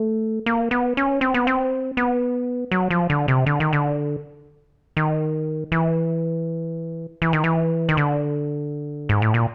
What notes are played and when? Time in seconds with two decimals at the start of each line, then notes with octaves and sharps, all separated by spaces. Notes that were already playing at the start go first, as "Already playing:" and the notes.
Already playing: A3
0.46 A#3
0.71 B3
0.97 C#4
1.21 C4
1.34 B3
1.47 C4
1.97 B3
2.72 F#3
2.91 F3
3.10 D3
3.28 C3
3.46 D3
3.60 D#3
3.73 D3
4.97 D#3
5.72 E3
7.22 E3
7.33 D#3
7.44 E3
7.89 D#3
7.97 D3
9.09 G#2
9.22 A2
9.34 A#2